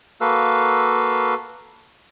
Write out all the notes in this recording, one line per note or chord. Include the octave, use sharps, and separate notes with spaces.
A#3 F#4 A4 B4 F5 E6